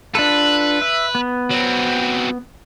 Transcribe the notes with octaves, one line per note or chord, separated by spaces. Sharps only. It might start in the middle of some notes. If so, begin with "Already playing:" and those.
D4 F4 A4 B4
E5
B3
F#3 C4